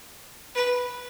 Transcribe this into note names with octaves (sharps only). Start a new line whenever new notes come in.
B4